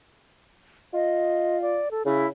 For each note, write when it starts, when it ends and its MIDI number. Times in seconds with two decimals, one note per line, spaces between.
0.94 1.81 65
0.94 1.60 75
1.62 1.89 74
1.91 2.03 69
2.06 2.27 49
2.06 2.27 64